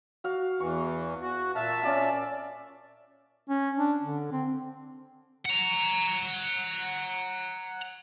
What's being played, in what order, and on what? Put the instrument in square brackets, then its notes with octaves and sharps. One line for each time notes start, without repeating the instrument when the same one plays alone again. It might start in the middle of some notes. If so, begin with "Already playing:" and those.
[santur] F#4 F5
[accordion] E2 E3 [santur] C#6
[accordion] F#4
[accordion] A#2 E5 A5 [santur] F5
[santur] C#4 D5 F5
[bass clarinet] C#4
D4
D3
C4
[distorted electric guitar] F#5 A#5